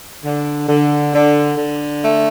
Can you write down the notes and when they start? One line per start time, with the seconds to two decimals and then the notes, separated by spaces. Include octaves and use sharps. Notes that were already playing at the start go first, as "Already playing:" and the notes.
0.24 D3
0.69 D3
1.13 D3
1.57 D3
2.02 A3